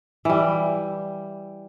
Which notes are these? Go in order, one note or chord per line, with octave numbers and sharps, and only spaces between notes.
E3 G3